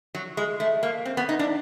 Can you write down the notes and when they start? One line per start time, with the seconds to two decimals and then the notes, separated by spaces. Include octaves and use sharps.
0.15 F#3
0.37 G#3
0.60 A3
0.83 A#3
1.05 C4
1.17 B3
1.29 D#4
1.39 D4